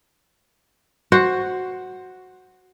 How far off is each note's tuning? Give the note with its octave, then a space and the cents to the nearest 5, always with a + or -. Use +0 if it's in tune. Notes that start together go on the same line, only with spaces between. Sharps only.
F#4 +0 C5 +10